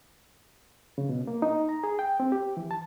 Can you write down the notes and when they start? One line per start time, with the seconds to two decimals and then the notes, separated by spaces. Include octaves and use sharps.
0.98 C#3
1.09 B2
1.27 A#3
1.42 D#4
1.69 A#5
1.84 G#4
1.99 G5
2.20 C4
2.32 G4
2.57 E3
2.71 A5